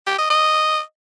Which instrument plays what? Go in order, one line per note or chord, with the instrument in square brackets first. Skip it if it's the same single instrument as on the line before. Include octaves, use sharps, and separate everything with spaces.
[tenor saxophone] G4
D#5
D#5